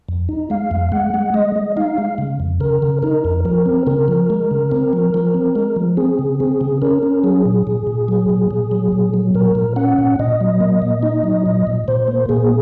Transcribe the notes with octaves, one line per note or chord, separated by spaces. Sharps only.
F2
D#4
G#3 F5
F2
G#3 F#5
G#3
G#3 D#5
G#3
D#4 F5
G#3
C#3
F2
C#3 A#4
C#3
D#4 A#4
F2
F3 A#4
C4
C#3 A#4
F3
G#3
C#3
C4
F3
F3
C4
G#3
F3
C4 G#4
C#3
C4 G#4
C#3
C#4 A#4
C#4
F#3 G#4
A#2
A#2
A#2
F#3
A#2
A#2
F#3
A#2
F#3
A#2 A#4
A#2
C#4 F#5
A#2
A#2 D#5
F#3
A#3
A#2
D#4
F#3
A#2
A#2
A#2 C5
A#3
A#2 G#4